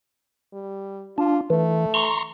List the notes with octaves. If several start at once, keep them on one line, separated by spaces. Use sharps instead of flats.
G3
D4 F4
E3 A3
A#5 C6 C#6